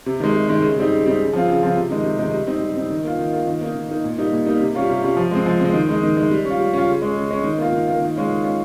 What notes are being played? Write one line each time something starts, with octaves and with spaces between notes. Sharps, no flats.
C3
D#3 G#3
C3
D#3 G#3
C#3
G3 C4 D#4
C#3
G3 C4 D#4
C#3
F3 C4 F4
C#3
F3 C4 F4
C3
D#3 G#3 D#4
C3
D#3 G#3 D#4
G3
C4 D#4
G3
C4 D#4
D#3
A#3 F4
D#3
A#3 F4
D#3
A#3 D#4
D#3
A#3 D#4
A#2
G3 A#3 D#4
A#2
G3 A#3 D#4
C3
G3 C#4 F4
C3
G3 C#4 F4
F3
G#3 C4
F3
G#3 C4
D#3
G#3 D#4
D#3
G#3 D#4
G3
C#4
F4
G3
C#4 F4
C#3
G#3 C#4
C#3
G#3 C#4
D#3
A#3 F4
D#3
A#3 F4
D#3
G#3 C#4 F4
D#3
G#3 C#4 F4